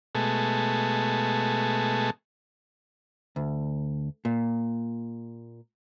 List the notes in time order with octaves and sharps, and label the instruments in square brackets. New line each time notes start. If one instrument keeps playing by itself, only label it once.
[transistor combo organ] B2 G#3 A3
[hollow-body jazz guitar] D2
A#2